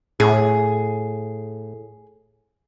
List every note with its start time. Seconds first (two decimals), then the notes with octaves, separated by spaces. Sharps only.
0.20 A2 G#4